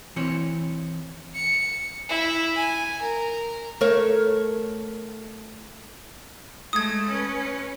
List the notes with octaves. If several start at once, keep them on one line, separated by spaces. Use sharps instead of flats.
E3 C4 C#5
C#7
E4
G#5
A#4
A3 A#4 C#5
G#3 A3 D#6 G#6
C#4 B4